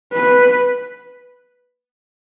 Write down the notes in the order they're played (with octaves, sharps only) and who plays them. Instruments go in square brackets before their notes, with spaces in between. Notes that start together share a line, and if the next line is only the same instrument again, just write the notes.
[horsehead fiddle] B4